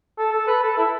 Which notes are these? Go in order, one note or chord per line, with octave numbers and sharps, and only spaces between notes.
A4
A4
B4
A4
E4